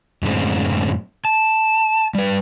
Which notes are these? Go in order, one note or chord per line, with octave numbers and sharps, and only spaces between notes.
F#2 A2 D3 G#3 C4
A5
G3 B4